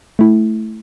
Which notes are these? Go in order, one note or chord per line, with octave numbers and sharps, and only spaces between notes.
A3 E4